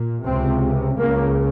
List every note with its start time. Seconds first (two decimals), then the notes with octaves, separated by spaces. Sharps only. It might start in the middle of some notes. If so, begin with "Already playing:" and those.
Already playing: A#2
0.25 C#2 C3 C4
0.97 C#2 C#3 A#3